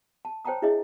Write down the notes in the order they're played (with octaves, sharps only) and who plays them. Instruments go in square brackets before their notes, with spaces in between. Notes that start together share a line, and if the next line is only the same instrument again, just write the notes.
[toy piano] A5
C5 C#5 G5 A5 A#5 D#6
D4 E4 G#4 C#5 D#5 E5